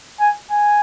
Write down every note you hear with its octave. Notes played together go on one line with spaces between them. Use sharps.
G#5
G#5